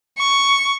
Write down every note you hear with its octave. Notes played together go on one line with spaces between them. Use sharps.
C#6